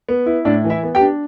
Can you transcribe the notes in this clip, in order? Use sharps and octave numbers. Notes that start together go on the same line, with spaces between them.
B3
E4
A2 D4 D5
E3
E4 E5
B3
G4 G5
D4